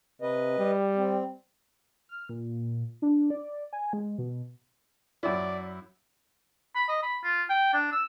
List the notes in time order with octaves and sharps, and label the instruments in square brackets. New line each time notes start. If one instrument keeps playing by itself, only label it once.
[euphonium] C3 [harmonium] B4 D#5
[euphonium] G3
[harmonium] C4
[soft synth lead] F6
A#2
D4
D5
G#5
G#3
B2
[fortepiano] F#2 E4 [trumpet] D5
[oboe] B5
D#5
B5
F4
G5
D4
E6